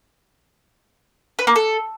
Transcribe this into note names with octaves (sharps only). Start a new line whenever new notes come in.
B4
A#3
A4